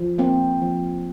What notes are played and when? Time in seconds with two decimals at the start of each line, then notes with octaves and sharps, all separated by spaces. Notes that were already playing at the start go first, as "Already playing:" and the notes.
Already playing: F3
0.18 A#3 C4
0.62 F3